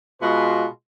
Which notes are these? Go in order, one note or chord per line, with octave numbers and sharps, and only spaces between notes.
B2 G#3 F4 F#4 B4 C6